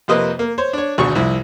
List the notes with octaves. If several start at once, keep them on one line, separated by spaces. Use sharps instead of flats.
F2 C3 A#3 B4 C5 D#5
A#3
C5 C#5
D4 C#5
G#1 D2 B2 C#6
C2 F2 E4